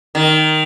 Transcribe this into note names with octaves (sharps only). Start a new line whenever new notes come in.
D#3